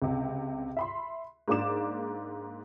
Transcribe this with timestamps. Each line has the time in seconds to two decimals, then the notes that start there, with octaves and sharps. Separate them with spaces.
0.02 C#2 C3
0.77 E5 B5 C6
1.48 G#2 A#3 D4 D5 D6 E7